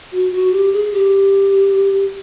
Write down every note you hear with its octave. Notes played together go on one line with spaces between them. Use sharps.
F#4
F#4
G4
G#4
G4